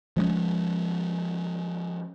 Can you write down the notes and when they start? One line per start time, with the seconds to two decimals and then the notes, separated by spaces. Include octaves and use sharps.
0.17 F3 G#3 A3 C#4